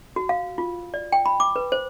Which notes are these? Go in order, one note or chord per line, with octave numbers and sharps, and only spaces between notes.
F#4
F5
F4
D5
G5
B5
D6
B4
C5